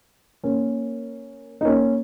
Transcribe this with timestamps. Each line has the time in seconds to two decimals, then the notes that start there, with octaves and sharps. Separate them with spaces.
0.44 A#3 C#4
1.61 D#4
1.65 A#3 C#4